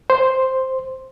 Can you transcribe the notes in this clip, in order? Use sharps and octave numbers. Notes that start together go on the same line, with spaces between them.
C5